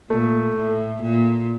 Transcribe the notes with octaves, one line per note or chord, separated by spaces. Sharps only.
A#2 A3
A2
A#2